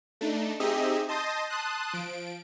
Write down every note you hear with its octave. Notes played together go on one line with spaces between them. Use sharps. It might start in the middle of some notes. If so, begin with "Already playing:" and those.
A3 D4 D#4
C4 D#4 G4 G#4 D#5 E5
D#5 A5 C6 D#6 G6 A#6
A5 C6 D#6 F#6
F3 D7